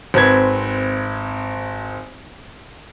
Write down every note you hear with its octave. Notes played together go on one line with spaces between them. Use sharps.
G#1 C4 B4 G#6